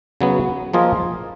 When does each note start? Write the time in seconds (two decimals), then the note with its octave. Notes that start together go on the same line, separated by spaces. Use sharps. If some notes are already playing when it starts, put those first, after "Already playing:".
0.21 C#3 F#3 B3
0.73 F3 A#3 F4 G#4 D#5